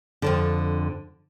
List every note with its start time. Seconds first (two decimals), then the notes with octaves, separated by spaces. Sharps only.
0.22 F2 G#2 D3